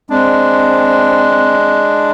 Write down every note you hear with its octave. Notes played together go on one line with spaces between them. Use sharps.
G#3 C4 D4